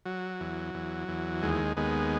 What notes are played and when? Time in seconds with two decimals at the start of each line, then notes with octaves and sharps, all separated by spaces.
0.05 F#3
0.40 E2
0.75 E2
1.08 E2
1.42 D#2 G#3
1.77 D#2 G#3 B3